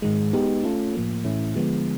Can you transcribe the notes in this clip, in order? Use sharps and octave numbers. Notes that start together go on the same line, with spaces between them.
G#2 D#3 G#3
G#3 B3 D#4 G4
A3 C#4 F4 A4
A2 F3 A#3
A2 E3 A3 C#4 E4
D3 F3 G#3 B3